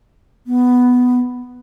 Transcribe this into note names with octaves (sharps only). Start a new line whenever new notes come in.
B3